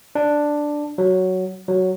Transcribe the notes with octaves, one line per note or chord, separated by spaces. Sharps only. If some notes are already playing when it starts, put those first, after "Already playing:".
D4
F#3
F#3